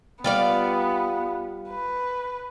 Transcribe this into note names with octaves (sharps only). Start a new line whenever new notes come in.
G3 B3 F4 D5
B4